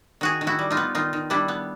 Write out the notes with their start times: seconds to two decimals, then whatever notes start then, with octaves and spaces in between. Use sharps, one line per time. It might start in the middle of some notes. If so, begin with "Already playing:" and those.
0.21 D#3 F#4 G#4
0.41 D#3
0.47 E4 F#4
0.59 G3
0.71 D#4 F4
0.77 B3
0.95 D#3 D#4 F4
1.13 D#3
1.30 G3 D4 E4
1.48 B3